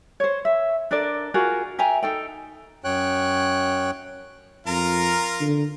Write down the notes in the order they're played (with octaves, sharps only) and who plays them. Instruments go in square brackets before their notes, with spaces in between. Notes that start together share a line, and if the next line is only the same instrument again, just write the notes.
[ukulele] C5 C#5
E5
D4 A4 A#4 D5
F4 F#4 G#4 A#4
E5 G5 G#5 A#5
D#4 A4 G5
[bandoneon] F#2 C#5 G5 F#6
[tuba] F2 [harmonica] F4 A#4 A#5
[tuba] D3